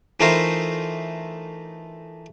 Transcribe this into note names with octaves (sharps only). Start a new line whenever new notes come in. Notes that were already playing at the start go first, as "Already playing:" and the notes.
E3 A3 D#4 F4 A#4 C5